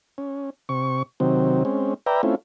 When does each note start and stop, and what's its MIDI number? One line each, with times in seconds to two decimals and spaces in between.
0.18 0.50 61
0.69 1.03 48
0.69 1.03 85
1.20 1.63 48
1.20 1.63 51
1.20 1.63 54
1.20 1.63 60
1.65 1.94 56
1.65 1.94 60
1.65 1.94 61
2.06 2.22 71
2.06 2.22 74
2.06 2.22 76
2.06 2.22 79
2.06 2.22 82
2.23 2.35 57
2.23 2.35 60
2.23 2.35 61
2.23 2.35 64
2.23 2.35 65